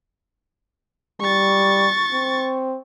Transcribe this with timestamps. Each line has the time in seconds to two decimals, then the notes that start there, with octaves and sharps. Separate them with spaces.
1.21 G3 C#6 A6
2.13 C4